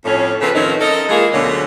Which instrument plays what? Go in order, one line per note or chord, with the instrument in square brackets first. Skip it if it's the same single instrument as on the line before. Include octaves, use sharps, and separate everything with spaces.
[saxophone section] F2 A2 C#4
C#3 F3 C4 A4 B4
D#3 F3 A3 C4 C#4 D#4
A4 A#4 D#5
E3 G#3 A#3 F4 G#4
D2 B2 D3 F#3 A3 C#4